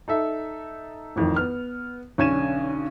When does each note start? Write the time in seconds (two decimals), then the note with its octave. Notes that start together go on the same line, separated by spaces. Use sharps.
0.08 D#4 A4 E5
1.16 A1 F2 D#3
1.36 B3 F6
2.18 B1 D3 C#4 G#6 D#7 E7